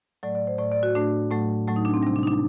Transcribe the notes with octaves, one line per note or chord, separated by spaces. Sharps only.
A2 F#3 A3 D5
D5
C5
A2 A3 D5
D5
F#4
A2 A3 D4
A2 F#3 A3
A2 F#3 A3
D#4
D4
C4
C3 G3 D4
D4
D#4
D4